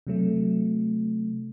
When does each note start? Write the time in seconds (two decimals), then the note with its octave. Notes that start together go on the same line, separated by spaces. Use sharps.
0.07 C3 F#3 A3